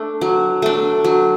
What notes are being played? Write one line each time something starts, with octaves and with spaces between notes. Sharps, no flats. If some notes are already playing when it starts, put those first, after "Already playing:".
Already playing: A3 D4
F#3
A3 D4
F#3